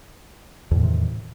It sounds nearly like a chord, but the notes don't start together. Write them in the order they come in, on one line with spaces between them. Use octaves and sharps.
E2 A2 D#3 C3